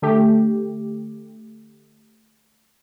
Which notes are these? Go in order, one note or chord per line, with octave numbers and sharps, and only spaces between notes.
D3 A3 G4